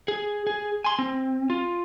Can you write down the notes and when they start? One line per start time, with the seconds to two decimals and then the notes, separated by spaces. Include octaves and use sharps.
0.08 G#4
0.47 G#4
0.84 G#5 C6
0.99 C4
1.50 F4